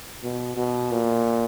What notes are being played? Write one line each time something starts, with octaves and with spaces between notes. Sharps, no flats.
B2
B2
A#2